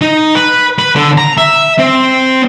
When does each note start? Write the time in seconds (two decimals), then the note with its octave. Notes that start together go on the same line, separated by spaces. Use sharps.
0.01 D#4
0.35 B4
0.78 B4
0.95 D3
1.18 A#5
1.37 E5
1.79 C4